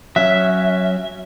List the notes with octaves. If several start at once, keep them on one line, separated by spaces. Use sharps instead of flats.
F#3 C#4 E5